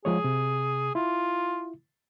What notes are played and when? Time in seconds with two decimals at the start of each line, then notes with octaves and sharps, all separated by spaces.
0.05 F3 G#3 G#4 C#5
0.24 C3
0.95 E4 F4